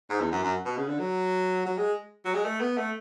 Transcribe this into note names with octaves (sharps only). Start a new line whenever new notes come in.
G#2
E2
F#2
F#2
B2
C#3
D3
F#3
F#3
G#3
F#3
G#3
A3
B3
A3